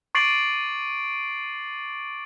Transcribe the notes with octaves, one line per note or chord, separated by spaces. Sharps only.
C#6 D6 A6 C7 D7 F#7